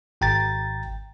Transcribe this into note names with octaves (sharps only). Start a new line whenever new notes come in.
G#1 G5 A#5 A6